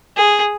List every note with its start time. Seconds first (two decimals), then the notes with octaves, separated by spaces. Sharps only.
0.17 G#4